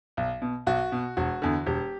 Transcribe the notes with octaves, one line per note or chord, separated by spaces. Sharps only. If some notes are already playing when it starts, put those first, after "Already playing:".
B1
B2
B1 F#4
B2
E1 F#4
E2 D3
E1 G4